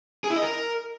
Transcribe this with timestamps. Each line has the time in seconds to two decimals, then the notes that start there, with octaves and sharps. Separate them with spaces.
0.24 G#4
0.30 E4
0.36 D#5
0.42 A#4